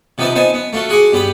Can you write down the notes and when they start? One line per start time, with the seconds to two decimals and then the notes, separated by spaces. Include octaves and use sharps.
0.18 C3 F3 B3 D#4 B4 A5
0.35 B3 D#4 C5 G#5 A5
0.54 B3
0.73 A3 F4 F#4 A4
0.89 F#4 G#4 F#5 C6 D6
1.13 G2 B3 G4 B5